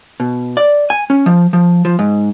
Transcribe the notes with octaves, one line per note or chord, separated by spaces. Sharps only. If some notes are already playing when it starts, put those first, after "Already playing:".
B2
D5
G#5
C#4
F3
F3
F3
G#2